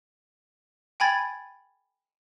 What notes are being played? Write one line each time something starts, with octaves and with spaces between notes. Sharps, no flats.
G5 G#5 B5 G#6 A6